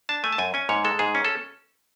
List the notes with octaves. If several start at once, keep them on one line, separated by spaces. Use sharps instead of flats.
D4 A5
A3 G#5
A5
F#2 G#5
C#4 G#5
G#2 C#5
G#3 A4
G#2 G#4
C#4
A4